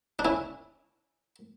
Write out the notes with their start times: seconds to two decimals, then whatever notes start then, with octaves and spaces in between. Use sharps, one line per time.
0.19 D4
0.25 C#4 E4